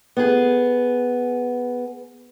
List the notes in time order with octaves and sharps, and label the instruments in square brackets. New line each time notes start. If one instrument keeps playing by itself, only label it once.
[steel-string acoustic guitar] B3 G#4